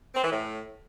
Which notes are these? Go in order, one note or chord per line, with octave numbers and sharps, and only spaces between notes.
C4
E3
A2